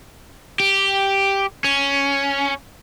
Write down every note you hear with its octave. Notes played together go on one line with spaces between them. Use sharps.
G4
C#4